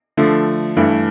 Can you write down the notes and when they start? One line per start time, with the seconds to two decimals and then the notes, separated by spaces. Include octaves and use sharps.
0.17 D3 F3 A3
0.77 G2 E3 A3